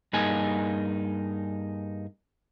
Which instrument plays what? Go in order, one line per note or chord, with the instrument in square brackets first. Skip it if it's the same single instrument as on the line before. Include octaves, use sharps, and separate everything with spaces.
[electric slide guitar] G2 A#3 D#4 G#4 G#5